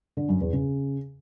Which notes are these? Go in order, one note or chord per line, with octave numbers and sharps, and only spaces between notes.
D3
F#2
E2
C#3